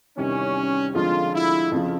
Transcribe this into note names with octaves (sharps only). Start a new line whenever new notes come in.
E2 C3 D#3 G3 C#4
F2 D3 F3 G#3 F4
E4
F2 C#3 F3